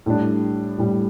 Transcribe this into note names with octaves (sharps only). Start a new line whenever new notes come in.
A2 G3 D4
A2 G3 D4